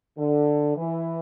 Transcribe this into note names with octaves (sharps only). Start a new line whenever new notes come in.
D3
E3